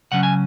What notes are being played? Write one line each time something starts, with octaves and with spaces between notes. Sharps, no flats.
C#3 F#3 C#4 F#5
G#5